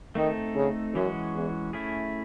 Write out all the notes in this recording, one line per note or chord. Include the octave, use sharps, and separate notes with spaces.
D#3 A3 C4 D#4 A4
C#3
F#2 E3 G#3 C#4 F#4
E2
A3 C#4 E4 G#4